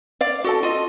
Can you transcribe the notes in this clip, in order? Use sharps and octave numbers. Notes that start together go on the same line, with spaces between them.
D5 F5
F#4 A4 A5
F4 D#5